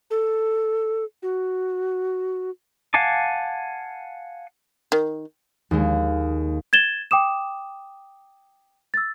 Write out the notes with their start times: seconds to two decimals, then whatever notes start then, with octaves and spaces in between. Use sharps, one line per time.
0.10 A4
1.22 F#4
2.94 F5 F#5 G#5 A5 D6
4.92 D#3
5.71 D#2 G#3
6.73 G#6 A6 E7 G7
7.11 G5 D6 D#6 E7
8.94 E6 A6